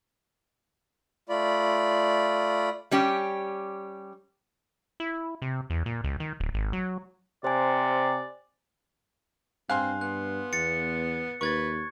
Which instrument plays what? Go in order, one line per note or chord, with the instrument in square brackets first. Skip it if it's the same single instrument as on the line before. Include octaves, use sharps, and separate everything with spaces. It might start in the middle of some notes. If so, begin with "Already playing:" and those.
[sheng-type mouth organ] A3 F4 D5 B5
[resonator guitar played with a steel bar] G3 C#4 G4
[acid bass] E4
C3
E2
A#2
C#2
D#3
D1
G#1
F#3
[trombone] C3 [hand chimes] C5 G#5 [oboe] D5
[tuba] G2 [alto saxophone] C4 [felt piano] F5 G#5 C6 [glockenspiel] F#6
[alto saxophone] B3 [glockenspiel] F#6
[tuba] E2 [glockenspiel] A6 C#7
[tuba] D#2 [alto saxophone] B4 [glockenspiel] C#6 G#6 A6